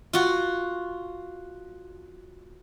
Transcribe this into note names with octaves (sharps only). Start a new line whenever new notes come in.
F4 F#4